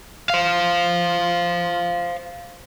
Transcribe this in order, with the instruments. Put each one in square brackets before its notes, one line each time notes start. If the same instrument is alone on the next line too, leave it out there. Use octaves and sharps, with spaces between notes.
[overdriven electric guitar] C5 F5